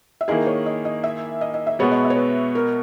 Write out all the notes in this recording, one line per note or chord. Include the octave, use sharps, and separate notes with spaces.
E5
D#3 A#3 E4 G#4 D#5
C#5
D#5
D#5
E5
D#5
D#5
E5
B2 G#3 B3 F#4 C#5
D#5
E5
C#5
B4
A#4